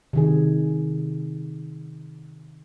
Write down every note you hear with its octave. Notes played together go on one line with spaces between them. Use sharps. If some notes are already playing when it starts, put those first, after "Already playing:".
C3 D#3 G#4